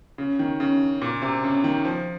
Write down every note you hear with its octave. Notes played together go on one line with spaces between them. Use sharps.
C#3
D#3
C#3
A#2
C3
C#3
D#3
F3